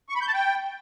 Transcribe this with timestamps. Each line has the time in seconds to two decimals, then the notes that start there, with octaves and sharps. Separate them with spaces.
0.09 C#6
0.15 B5
0.21 G6
0.28 A5
0.34 G5